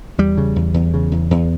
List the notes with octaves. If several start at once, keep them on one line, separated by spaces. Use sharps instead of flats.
E2 G3
C#3
E2
E2
C#3
E2
E2